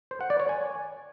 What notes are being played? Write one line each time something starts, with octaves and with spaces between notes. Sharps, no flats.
C5
F#5
D5
C#5
G#5